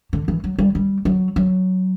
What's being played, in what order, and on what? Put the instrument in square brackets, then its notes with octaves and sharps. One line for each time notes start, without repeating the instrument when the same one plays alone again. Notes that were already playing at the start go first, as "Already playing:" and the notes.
[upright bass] D3
E3
F#3
G3
G3
F#3
F#3